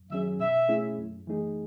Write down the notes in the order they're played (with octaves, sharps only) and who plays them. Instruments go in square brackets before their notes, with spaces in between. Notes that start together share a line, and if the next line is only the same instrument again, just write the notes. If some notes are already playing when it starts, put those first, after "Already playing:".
Already playing: [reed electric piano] F#2
[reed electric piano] D#3 F#3 C#4 G#4 [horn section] E5
[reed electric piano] B2 [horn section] E5
[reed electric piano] A3 C#4 E4 G#4
F#2
E3 A3 D#4 G#4